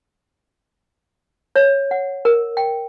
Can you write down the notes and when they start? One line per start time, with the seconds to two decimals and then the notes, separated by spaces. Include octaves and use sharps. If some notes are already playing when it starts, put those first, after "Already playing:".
1.56 C#5
1.91 F#5
2.25 A#4
2.57 G5